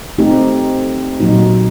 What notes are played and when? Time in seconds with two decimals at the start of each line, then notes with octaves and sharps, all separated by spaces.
0.18 A3 C4 D#4 G4
1.20 A#2 F#3 A#3 D#4 F#4